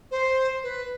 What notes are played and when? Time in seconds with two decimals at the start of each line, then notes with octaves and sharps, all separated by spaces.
0.11 C5
0.63 B4